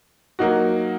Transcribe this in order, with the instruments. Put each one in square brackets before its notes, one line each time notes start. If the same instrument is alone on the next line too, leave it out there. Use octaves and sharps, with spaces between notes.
[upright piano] F#3 A#3 D#4 F#4